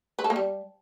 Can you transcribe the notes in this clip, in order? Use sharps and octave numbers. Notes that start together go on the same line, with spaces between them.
B4
A4
A#3
G3